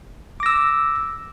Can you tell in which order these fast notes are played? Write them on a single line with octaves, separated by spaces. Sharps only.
D6 A#6 E6